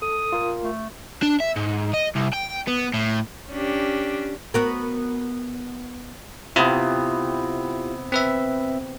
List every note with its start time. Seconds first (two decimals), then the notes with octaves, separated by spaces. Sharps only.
0.02 A4 D#6
0.32 F4 A#4
0.63 A3
1.23 D4
1.40 E5
1.56 G#2
1.93 D#5
2.15 C2
2.33 G5
2.67 B3
2.94 A2
3.49 C#4 D4 G4
4.54 B3 F#4 A#4
6.56 C3 B3 E4 F4 G4
8.12 C4 B4 E5